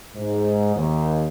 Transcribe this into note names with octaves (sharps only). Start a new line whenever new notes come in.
G#2
D#2